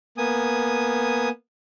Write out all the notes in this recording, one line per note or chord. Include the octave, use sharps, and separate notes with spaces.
A#3 B3 G#5 D#6